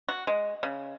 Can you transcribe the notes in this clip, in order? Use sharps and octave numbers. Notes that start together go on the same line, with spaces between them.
F#4
G#3
C#3